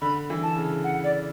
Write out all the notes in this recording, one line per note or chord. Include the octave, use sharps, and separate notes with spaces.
D3 B5
E3
A5
C#3
F#5
D5